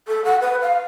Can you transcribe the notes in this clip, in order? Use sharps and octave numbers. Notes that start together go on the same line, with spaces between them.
A4
F#5
B4
F5